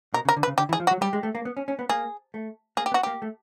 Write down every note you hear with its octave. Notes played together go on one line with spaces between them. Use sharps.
B2 A#4
C#3
A#4
D3
B4
C#3
D3 G4
E3
G#4
F3
F#4
F#3
G3 G4
G#3
A3
A#3
B3
C#4
C#4
B3
A#3 G#4
A3
A#3 G#4
G4
B3
F#4
A#3 G4
A3